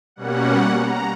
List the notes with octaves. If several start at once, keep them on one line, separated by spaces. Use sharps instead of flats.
B2 G3 A#3 C#4 F#5
A#5